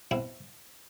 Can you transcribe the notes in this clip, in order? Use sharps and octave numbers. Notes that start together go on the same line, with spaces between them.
B2 C4 E4